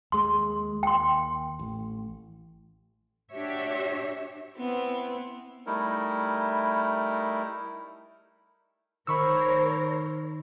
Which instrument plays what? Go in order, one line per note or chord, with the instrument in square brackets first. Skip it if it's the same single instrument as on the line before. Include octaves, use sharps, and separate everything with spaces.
[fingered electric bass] D#2 G#3 [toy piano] C6
[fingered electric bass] D#2 [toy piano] G5 C6
[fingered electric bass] A1
[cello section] D4 F#4 G4 C#5 E5
[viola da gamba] B3 C4 E4
[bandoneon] G3 A3 D#4 E4 A#4
[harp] D#3 [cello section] A#4 C5 C#5 [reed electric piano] B5 C#6 E6